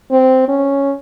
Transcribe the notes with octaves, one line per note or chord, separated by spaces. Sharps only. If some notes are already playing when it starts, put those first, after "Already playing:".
C4
C#4